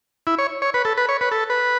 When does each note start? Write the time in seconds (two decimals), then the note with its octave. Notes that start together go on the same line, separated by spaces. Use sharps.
0.27 E4
0.38 C#5
0.62 C#5
0.74 B4
0.85 A4
0.97 B4
1.09 C#5
1.21 B4
1.32 A4
1.50 B4